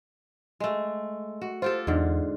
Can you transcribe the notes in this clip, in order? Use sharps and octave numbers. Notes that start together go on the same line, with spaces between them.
G#3 A3
F#4
F4 G4 A4 C5
E2 G#2 D3